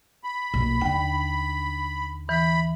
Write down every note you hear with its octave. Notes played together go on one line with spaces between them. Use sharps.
B5
B1 A#2
D#2 D3 D4 G5
E3 B5